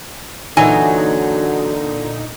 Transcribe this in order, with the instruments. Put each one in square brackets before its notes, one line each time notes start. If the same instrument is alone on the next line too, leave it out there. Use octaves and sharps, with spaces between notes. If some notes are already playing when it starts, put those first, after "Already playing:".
[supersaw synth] A#2 D#4 [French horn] D3 [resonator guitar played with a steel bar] E3 G#5 [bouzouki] F#3